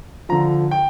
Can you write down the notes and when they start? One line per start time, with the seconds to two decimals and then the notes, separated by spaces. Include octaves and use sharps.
0.29 D3 F3 A#5
0.71 G5